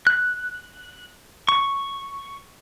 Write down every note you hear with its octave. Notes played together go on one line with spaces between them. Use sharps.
F#6
C#6